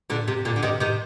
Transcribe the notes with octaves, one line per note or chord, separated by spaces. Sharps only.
A#2 D3
C3
A#2 D3
D3
C3 D#3
C3 D#3